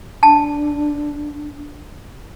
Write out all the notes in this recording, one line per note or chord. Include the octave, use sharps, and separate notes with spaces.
D4 A5